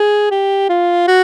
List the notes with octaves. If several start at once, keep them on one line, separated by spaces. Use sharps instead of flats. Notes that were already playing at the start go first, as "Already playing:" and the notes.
Already playing: G#4
G4
F4
F#4